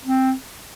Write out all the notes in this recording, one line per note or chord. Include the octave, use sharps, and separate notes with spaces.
C4